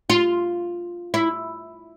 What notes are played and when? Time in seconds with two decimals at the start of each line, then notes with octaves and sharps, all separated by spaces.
0.10 F4
1.14 E4